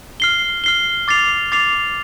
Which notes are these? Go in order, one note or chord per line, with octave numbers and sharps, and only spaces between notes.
F6 C7 G7
F6 C7 G7
D6 A6 C7 F7
D6 A6 C7 F7